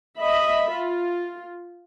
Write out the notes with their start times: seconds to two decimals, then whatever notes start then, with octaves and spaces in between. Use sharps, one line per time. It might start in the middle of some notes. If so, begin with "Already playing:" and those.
0.19 D#5 E5 B5
0.71 F4